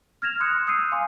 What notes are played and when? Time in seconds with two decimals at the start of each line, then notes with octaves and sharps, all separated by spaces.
0.22 F6 G#6 A#6 E7 F7
0.40 C6 D#6 F#6 C#7
0.67 D#6 E6 G6 C7 D#7
0.92 F5 G#5 C6 D6